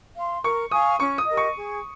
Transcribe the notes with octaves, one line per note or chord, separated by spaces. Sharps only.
F5 C6
A#4 C#6
F5 G#5 C#6 D#6
C#4 C#6
D#6
G4 A#4 D#5
C#6
G#4